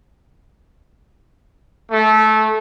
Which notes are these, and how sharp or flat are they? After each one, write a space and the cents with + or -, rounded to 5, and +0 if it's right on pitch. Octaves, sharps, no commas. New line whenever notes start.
A3 -20